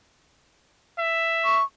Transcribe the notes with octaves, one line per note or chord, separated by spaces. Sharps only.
E5
C#6